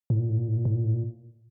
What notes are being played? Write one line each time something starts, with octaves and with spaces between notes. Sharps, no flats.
A2
A#2
A2
A#2
A2
A#2
A2
A#2
A2
A#2